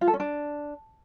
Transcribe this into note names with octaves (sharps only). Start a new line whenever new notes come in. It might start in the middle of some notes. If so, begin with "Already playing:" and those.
F4
A4
C#4
D4